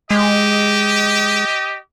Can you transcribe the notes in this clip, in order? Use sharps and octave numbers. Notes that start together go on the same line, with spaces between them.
G#3 G4 D#5